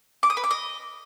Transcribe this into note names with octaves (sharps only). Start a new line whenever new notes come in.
D6
D#6
B4
D6
D#5